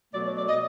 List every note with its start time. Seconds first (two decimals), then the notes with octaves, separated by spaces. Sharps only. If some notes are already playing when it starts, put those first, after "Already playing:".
0.12 B2 F#3 A3 D5
0.24 C#5
0.37 D5
0.48 D#5